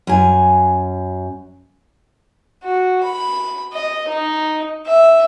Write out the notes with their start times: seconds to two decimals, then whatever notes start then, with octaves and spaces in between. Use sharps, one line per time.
0.07 F#2 G#5
2.64 F#4
3.03 B5
3.73 D#5
4.09 D#4
4.87 E5